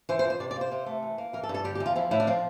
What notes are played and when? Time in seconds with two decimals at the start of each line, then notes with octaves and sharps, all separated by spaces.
0.09 E3 C5
0.19 C5
0.24 F2
0.30 C5
0.40 C3 D5
0.51 D5
0.56 A#3
0.61 C5
0.71 C3
0.86 A3
1.02 E3
1.18 A#3
1.33 E3 A#4
1.43 A4
1.49 G2
1.54 A4
1.64 D3 G4
1.75 G4
1.80 E2
1.86 F4
1.96 F3 E4
2.11 A2 E4
2.20 D4
2.27 F3 C4